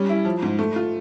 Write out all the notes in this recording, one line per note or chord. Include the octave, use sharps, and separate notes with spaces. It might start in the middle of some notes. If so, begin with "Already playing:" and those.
Already playing: G3 C#4
E4
F3
G#2
A3
F4